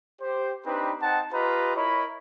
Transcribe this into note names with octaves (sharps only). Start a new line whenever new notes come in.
G4 C5
C4 D4 D#4 G4 B4
C4 D#4 F#5 A5
F4 G4 B4 D#5 A#5 B5
E4 A#4 C#5 D#5 B5